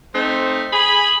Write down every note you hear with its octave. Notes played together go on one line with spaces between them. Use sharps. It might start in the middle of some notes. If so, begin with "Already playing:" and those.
A3 C4 D#4 C5
G#4 B5